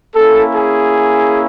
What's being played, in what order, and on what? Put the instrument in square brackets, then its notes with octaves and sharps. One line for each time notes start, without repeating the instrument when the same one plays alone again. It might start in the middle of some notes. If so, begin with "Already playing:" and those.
[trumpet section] A#3 C#4 E4 A4
G#4